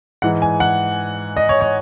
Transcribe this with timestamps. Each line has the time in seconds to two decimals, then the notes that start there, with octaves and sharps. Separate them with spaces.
0.22 G#2 E3 F#5
0.42 G#5
0.60 F#5
1.37 D#5
1.49 C#5
1.61 C#5